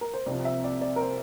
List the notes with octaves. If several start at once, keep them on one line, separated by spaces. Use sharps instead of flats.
A#4
C5
C2 C3 F3 D5
E5
D5
D5
A#4
C5